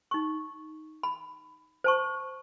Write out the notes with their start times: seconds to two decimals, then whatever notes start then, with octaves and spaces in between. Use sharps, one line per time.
0.11 D#4 C#6
1.03 B5
1.84 C5 A5 C#6